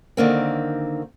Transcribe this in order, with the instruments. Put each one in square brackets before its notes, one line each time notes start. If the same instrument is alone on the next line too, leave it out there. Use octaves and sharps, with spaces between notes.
[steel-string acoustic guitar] D3 D#3 A#3 C4